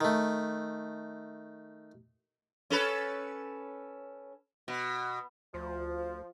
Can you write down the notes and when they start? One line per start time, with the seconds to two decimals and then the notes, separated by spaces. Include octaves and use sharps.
0.01 D#3 A3
2.70 C#4 A4 B4
4.68 B2
5.54 D2 F3